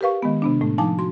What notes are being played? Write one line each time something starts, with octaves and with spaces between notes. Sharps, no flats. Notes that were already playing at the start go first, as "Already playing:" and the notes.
G4 A#4 B4 F5 C#6
D#3 G#3 B3
C3 B3 D4
A2 A3
F3 D#4 G#5 A5 D6
F#4 C6